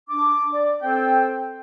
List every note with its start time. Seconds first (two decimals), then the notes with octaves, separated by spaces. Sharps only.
0.09 D4 D6
0.52 D5
0.82 C4 A4 C5 G5